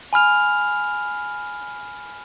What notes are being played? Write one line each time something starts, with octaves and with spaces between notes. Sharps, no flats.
G#5 B5 F6 F7